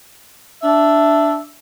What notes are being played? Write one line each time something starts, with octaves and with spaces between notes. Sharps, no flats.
D4 E5